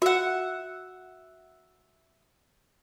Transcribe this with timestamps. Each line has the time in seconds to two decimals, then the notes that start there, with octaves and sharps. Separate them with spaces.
0.02 F#4 E5 F#5